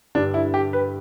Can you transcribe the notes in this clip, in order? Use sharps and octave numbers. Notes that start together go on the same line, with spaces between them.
G2 D3 G3 D4
E4
G4
B4